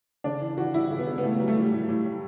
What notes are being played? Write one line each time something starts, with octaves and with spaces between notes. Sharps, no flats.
C#3 D4
E3
E3 F#4
G3 E4
C#3
B3
C#3
B3
A2 A3
F#3 G3
A3
A2 G3
A2
A2
A2